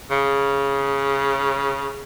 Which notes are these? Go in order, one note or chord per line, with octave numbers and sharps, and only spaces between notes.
C#3